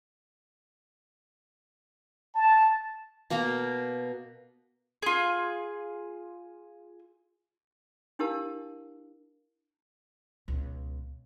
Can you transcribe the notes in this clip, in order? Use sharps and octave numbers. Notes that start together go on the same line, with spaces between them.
A5
B2 A#3 F5 A#5
F4 G#4
D4 E4 G4 A#4 F5 A5
C#2 B2